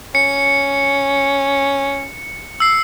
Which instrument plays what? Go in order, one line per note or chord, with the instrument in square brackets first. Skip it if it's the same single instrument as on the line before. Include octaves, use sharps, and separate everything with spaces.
[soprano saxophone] C#4 [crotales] C#7
[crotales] E6 C7